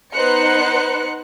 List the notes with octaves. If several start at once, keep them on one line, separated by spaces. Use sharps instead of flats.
B3 D#4 B4 C5 F#6 C#7